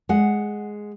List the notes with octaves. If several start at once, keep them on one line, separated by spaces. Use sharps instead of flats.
G#3 F#5